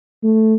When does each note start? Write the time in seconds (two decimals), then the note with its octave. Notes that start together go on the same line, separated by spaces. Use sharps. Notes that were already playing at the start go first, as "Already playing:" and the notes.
0.23 A3